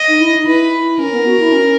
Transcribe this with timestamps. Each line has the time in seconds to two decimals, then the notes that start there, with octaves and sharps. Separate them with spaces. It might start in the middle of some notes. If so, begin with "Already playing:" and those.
Already playing: D#5
0.08 D#4
0.19 E4
0.36 D#4
0.46 E4 B4
0.72 E4
0.99 C#4 A#4
1.13 B3
1.26 F#4
1.40 E4
1.52 C#4